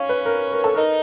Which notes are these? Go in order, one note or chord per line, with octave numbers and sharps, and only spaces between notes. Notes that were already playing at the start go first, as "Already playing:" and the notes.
Already playing: C#4 C#5 F5
B4
A#4
A#4
A4
D#4 A#4 D#5